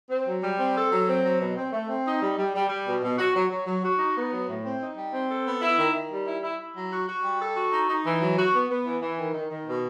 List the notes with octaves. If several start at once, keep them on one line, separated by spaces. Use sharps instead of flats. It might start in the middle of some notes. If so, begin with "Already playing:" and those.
C4
F#3
G3
C4
A4
F#3
C4
F#3
B2
C4
A3
C4
D#4
G3
G3
G3
G3
B2
B2
F#4
F#3
F#3
F#3
F#4
D#4
B3
F#3
A2
C4
D#4
G3
C4
A4
B3
E4
D#3
D#3
G3
E4
E4
E4
F#3
F#4
F#4
G3
A4
F#4
D#4
D#4
E3
F#3
F#4
B3
B3
E3
E3
D#3
D#3
D#3
B2